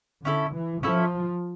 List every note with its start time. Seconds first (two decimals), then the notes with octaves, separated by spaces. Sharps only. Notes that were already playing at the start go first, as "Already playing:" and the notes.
0.25 D3 C#4 E4 A4
0.55 E3
0.83 F3 C#4 E4 A4